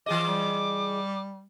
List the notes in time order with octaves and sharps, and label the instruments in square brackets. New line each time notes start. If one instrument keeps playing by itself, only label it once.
[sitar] E3 G#4 D#5 [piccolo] D6
[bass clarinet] G3